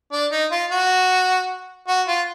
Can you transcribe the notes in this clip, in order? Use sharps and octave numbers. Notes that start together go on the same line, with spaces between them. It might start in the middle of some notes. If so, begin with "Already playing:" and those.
D4
D#4
F4
F#4
F#4
F4